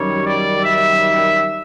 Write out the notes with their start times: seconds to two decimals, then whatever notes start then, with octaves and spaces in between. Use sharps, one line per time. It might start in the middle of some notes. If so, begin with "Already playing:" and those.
Already playing: F#2 D#3 G3 C#5
0.25 D5
0.64 E5